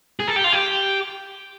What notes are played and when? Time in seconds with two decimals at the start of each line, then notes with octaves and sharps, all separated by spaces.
0.20 G#4
0.28 A4
0.36 G4
0.44 F4
0.53 G4